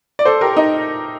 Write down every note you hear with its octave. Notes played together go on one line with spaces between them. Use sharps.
D5
A4 C5
G4 A#4
D#4